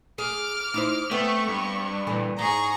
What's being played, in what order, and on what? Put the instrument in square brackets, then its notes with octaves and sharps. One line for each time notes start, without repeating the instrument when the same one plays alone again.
[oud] G#4 [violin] D6 F6
[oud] D#4 E4 C5
[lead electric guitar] A3 [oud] B3 C4 [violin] C#6
[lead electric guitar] G2
[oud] A#2 D3 E3
[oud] G#2 [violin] G#4 [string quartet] A#5 C#6